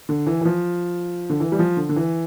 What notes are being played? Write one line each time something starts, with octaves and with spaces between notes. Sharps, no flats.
D3
E3
E3
F3
D3
E3
G3
F3
D3
D3
E3